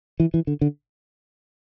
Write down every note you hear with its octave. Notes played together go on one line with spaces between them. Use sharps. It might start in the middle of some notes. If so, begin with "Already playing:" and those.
E3
E3
D3
D3